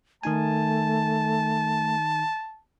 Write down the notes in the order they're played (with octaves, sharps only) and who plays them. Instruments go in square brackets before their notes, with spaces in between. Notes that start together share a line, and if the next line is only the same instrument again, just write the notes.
[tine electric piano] D#3 D#4 G#5 [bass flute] A3 [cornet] A5